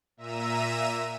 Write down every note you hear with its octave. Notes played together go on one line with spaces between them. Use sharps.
A#2 E5 A#5 E6 D#7